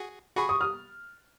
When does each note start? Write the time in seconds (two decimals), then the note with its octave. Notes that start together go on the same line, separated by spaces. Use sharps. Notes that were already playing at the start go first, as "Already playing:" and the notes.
Already playing: F#4 G#4
0.37 F#4 G#4 B5 C#6
0.49 C#6 D#6
0.61 D#6 F6